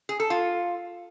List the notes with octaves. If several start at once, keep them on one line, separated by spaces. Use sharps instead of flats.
G#4
A4
F4